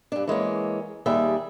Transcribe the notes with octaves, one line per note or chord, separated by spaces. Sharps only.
G2 D4
E3 G#3 A#3 C#4
D#2 G3 G#4 E5